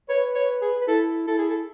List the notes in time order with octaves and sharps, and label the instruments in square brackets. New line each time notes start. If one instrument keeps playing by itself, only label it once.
[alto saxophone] B4 [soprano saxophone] C#5
[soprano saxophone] C#5
G#4
B4
[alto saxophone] E4 [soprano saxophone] A4
[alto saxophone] E4 [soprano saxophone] A4
[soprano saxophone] G#4
A4